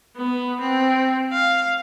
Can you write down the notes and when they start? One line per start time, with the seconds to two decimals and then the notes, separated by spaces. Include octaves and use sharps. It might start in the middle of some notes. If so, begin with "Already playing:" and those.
0.17 B3
0.61 C4
1.32 F5